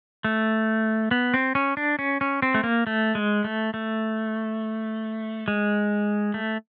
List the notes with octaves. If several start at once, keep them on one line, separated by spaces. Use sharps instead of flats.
A3
B3
C4
C#4
D4
C#4
C#4
C4
A3
A#3
A3
G#3
A3
A3
G#3
A3